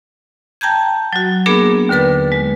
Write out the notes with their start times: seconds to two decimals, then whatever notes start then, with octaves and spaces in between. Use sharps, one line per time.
0.61 G5 A5 A#5 G6 G#6
1.13 F#3 F#4
1.46 A#3 B3 D4 G#4 A#4
1.89 D#2 D3 A#4 B4 A6
2.32 G#3